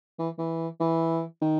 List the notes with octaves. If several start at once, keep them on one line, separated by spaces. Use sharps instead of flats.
E3
E3
E3
D#3